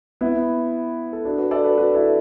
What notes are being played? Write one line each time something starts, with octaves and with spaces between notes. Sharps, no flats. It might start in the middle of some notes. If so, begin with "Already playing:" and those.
B3 E4
A4
D4 F#4
F#4 B4
A4 D5
F#4 B4
F#4 B4
E4 A4